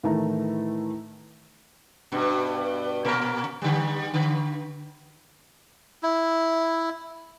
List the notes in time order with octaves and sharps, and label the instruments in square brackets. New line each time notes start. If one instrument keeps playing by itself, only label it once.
[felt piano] A2 D#3 E3 A3 A#5
[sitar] G2 B2
A#2 A#4
D3 G3
D3
[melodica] E4